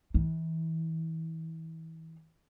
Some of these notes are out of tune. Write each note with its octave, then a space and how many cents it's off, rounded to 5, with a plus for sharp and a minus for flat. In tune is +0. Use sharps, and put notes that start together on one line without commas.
E3 -30